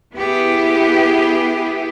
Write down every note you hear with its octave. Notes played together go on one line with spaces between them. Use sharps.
B3 E4 G4 G#4